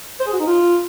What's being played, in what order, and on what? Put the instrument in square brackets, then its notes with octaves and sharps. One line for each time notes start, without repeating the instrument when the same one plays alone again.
[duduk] C5
G#4
F#4
D#4
F4